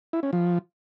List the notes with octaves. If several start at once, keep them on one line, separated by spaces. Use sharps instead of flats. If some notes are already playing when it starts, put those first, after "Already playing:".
E4
C#4
F3